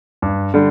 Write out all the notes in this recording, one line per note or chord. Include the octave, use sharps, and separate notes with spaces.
G2
D3 G3